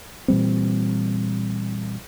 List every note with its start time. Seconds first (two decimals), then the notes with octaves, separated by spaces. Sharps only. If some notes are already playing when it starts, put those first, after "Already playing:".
0.28 A#2 E3 G3 C4